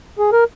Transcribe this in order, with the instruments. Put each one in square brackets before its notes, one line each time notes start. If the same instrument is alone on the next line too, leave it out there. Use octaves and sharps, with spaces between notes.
[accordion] G#4
A#4